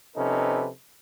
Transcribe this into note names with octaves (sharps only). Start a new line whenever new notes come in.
C3 F3 C#4 D#4 A4 B4